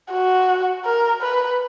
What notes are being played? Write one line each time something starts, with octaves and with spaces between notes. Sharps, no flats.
F#4
A#4
B4